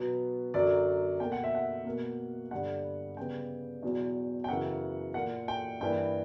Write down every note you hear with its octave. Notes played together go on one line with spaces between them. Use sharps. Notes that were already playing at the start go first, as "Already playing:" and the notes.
Already playing: B2 F#3 B3
F#2 D3 F#3 D5
B2 A#3 G5
F#5
E5
F#5
B2 A#3
G2 D3 G3 F#5
C#3 G3 B3 G5
E2 B2 F#3
G5
F#2 C#3 E3 F#5
A#2 A#3 F#5
G5
G2 E3 A#3 G5